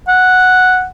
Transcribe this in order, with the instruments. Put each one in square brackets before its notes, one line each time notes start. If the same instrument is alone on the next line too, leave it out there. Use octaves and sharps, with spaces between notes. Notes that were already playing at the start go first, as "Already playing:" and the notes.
[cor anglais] F#5